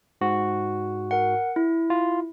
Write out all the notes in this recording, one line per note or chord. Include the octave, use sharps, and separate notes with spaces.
G#2 F#4
A#4 F#5
E4
F4